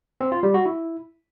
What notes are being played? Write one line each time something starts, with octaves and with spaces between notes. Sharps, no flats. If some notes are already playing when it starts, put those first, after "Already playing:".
C4
F4
G3
F#4
E4